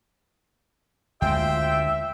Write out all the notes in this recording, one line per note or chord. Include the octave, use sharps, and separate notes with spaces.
D2 G#3 F4 C5 E5 G5